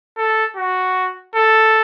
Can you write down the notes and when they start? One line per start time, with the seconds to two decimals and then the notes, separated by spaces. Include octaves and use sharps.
0.18 A4
0.57 F#4
1.35 A4